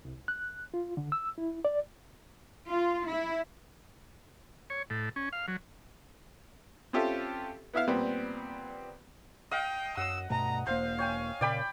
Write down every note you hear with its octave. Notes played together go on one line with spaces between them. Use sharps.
C2
F#6
F4
D3
E6
E4
D5
F4
E4
C#5
A2
C#4
F5
F#3
C4 C#4 F4 G4 A4 E5
B3 E4 E5 F5
A#2 G3 B3 C4
D#5 F5 G5
F#2 F#5 E6
G2 B2 A3 A#5
E1 A#3 C5 F5
C#5 G5 G#5
A#2 C#3 D5 G5 B5